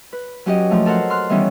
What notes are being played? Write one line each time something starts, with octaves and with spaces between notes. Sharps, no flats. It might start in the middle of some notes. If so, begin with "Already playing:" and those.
B4
F#3 C#4 G4 D#5
A#2 F3 A3
A4 A#4 C5 F#5
C6 F6 F#6
D#3 E3 G3 B3 C#4 E4